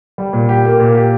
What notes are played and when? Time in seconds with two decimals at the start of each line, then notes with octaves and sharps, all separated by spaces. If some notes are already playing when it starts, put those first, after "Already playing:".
0.18 G3
0.33 A#2
0.49 G4
0.65 A#3
0.79 A#2
0.95 G4